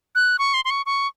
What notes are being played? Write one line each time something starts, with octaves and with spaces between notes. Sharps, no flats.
F#6
C#6
C6
C6
C#6
C#6